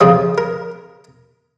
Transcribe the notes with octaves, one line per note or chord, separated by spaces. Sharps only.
F2 C#3 F3 G#4
A#4